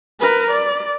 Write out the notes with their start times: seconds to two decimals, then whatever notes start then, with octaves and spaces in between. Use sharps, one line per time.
0.20 A#4 B4
0.52 D5